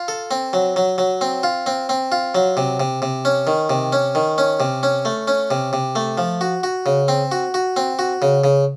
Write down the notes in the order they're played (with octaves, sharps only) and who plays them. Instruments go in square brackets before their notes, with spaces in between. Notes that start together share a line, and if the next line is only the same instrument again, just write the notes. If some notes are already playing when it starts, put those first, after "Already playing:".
Already playing: [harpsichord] F4
A4
C4
F#3
F#3
F#3
C4
F4
C4
C4
F4
F#3
C3
C3
C3
C#4
D#3
C3
C#4
D#3
C#4
C3
C#4
A3
C#4
C3
C3
A3
F3
F#4
F#4
C#3
C4
F#4
F#4
C4
F#4
C#3
C#3